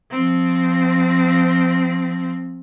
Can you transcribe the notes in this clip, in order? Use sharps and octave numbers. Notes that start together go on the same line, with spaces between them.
F3 C4